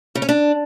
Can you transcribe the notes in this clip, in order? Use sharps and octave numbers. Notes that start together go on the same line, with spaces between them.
C#3
C#4
D4